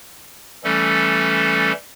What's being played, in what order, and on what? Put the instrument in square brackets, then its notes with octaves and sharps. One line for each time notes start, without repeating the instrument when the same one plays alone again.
[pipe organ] E3 G3 A3 C#4 A4